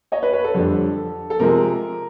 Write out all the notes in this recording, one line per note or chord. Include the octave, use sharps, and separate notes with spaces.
C#5 D#5
B4 C#5
B4 C#5
A4
F2 D3 G3 A4
A4
C3 F3 G#3 A#4